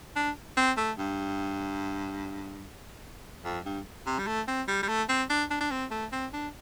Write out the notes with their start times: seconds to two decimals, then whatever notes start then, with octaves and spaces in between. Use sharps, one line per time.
0.16 D4
0.57 C4
0.77 A3
0.98 G2
3.45 F2
3.65 G2
4.06 C3
4.19 G3
4.27 A3
4.48 C4
4.68 G3
4.83 G3
4.88 A3
5.09 C4
5.30 D4
5.50 D4
5.61 D4
5.71 C4
5.91 A3
6.12 C4
6.33 D4